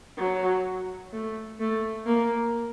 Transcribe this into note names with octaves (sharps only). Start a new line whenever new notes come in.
F#3
A3
A3
A#3